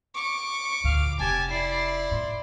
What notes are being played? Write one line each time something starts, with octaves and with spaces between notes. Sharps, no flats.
C#6 D6
D2 A#2 F5
F1 G4 G#5 A5
E4 D5 C7
A2 C6